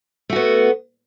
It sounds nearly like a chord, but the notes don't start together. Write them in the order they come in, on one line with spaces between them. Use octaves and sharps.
A3 F#4 B3